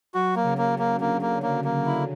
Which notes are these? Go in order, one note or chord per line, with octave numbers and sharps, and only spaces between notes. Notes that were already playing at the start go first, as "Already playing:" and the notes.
F#3 F#4
A#3
C#3
A#3
C#3
A#3
D3 A#3
A#3
D3 A#3
A#3
E4